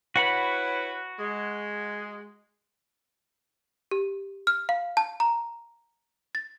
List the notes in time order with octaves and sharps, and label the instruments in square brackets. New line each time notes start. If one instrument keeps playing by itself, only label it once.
[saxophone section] E4 B4 C#5 [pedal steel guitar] F#4 F#5 B5
[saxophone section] G#3
[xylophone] G4
F6
F5
A5
A#5
A6